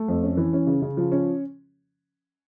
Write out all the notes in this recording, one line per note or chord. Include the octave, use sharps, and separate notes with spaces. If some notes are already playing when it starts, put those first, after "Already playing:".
Already playing: A3
F2
C#4
E3
C#4
C#3
C#3
F3
C#4